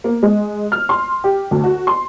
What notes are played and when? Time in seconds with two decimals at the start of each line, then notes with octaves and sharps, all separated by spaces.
0.04 A#3
0.23 G#3
0.72 F6
0.89 C6
1.24 G4
1.51 D2
1.64 F#4
1.87 C6